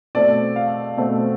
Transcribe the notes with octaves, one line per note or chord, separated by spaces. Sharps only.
B2 A3 C4 D5
F5
B2 A3 C4